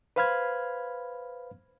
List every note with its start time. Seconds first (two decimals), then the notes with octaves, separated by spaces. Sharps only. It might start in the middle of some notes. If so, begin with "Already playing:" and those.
0.16 B4 C5 F5 B5 F6 G#6